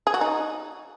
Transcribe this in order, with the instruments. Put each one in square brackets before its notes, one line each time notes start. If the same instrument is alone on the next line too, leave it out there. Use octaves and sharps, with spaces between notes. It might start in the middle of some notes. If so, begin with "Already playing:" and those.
[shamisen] G#4
F#4
D#4